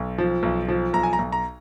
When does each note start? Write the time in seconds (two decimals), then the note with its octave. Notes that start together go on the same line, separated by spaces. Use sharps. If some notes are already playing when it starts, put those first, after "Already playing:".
Already playing: B1
0.18 F3
0.43 B1
0.68 F3
0.93 B1 A#5
1.03 G#5
1.13 A#5
1.19 B1
1.32 A#5